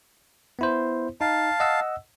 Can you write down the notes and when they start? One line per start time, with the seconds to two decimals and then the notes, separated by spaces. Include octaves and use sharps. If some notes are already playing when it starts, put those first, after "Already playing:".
0.59 B3 E4 C5
1.21 D#4 F5 A5
1.60 D#5 F#5 E6